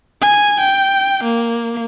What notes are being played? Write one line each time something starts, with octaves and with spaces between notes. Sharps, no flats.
G#5
G5
A#3